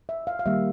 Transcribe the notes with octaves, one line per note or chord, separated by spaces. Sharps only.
E5
F5
F5
D#3 G3 A#3 E5